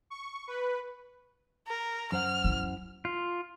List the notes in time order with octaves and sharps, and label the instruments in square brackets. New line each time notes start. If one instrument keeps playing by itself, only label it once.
[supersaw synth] C#6
B4
[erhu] A#4
[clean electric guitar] F#2 C5 F#5 [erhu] F6
[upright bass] E4
[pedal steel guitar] F4